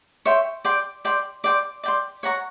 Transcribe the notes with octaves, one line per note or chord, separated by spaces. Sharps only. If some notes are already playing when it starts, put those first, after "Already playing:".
C#5 E5 G5 C6
D5 G5 C6
D5 G5 C6
D5 G5 C6
D5 G5 C6
C#5 F#5 A#5 C#6